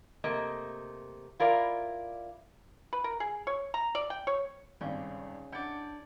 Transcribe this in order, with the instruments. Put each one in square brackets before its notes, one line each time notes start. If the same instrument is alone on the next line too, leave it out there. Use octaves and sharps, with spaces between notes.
[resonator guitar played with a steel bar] C3 A3 A#3 D#5
E4 F4 A#4 D5
[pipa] B4
A#4
G#4
C#5
A#5
D5
G5
C#5
[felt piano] G#1 G2 C4 [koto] C#3
[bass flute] D4 [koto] E4 D5 [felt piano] F#5 G6 C#7